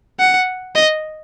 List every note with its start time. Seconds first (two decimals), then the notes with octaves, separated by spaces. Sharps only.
0.19 F#5
0.76 D#5